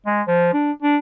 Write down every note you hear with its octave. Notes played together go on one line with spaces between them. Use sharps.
G#3
F3
D4
D4